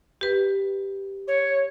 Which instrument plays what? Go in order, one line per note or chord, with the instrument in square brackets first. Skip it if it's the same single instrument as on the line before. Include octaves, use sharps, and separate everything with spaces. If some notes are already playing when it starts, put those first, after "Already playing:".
[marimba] G4 B4
[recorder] C#5